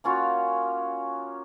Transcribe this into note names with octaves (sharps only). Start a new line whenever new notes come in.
A#3 C#4 F4 F#4